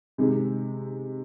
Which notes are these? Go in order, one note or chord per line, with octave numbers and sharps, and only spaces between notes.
C3 D#3 G#3